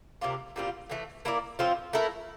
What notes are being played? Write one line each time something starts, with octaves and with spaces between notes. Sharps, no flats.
C3 G3 A#3 F4
A#2 G3 C4 F4
A2 E3 A3
A#3 E4 A#4 D5
A2 F3 C4 F4
A3 E4 A#4